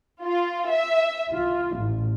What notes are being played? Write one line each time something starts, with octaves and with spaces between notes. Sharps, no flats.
F4
E5
F4
A1